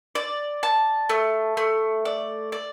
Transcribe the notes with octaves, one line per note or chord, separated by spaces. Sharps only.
D5
A5
A3
A3
D5
D5